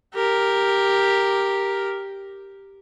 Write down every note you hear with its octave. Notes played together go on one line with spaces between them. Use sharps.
G4 A#4